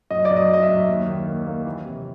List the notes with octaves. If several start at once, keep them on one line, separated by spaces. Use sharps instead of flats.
F#2 D#5
D5
F#2
D#5
F#3 D#5
E5
F#2
D#2
D#3
A#3
A#3
E3
C3